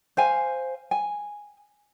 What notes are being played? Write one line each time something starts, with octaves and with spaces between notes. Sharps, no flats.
C5 F5 G#5
G#5